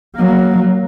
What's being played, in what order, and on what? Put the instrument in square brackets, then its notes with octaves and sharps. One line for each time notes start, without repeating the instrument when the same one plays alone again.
[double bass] F#3 A#3